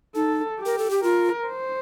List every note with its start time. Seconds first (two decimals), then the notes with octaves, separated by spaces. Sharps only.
0.15 D#4 A4
0.59 G4
0.66 A#4
0.78 A4
0.90 G4
1.03 F4 A#4
1.47 C5